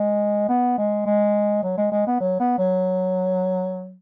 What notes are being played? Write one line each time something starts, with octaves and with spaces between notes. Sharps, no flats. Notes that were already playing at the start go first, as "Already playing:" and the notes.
Already playing: G#3
B3
G#3
G#3
F#3
G#3
G#3
B3
F#3
B3
F#3